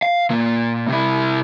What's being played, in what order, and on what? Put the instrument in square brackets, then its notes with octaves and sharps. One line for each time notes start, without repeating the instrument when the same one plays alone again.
[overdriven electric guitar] F5
A#2 A#3
C3 E4